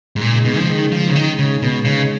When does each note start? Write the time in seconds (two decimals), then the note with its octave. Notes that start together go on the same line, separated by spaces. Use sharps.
0.16 G#2
0.21 A#2 C#3 G#3 D#4 G#4
0.45 B2
0.58 F3
0.69 D#3
0.92 F3
1.08 C#3
1.16 D#3
1.39 C#3
1.62 B2
1.85 C#3